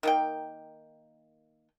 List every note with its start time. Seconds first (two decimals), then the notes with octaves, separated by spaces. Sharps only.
0.03 D#3 A#3 G5